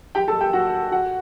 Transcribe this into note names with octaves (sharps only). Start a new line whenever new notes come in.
G4 G5
A4 A5
G4 G5
F#4 F#5
F#4 F#5